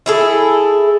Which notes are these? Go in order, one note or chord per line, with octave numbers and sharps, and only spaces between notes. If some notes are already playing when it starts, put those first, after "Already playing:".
E4 G#4 A4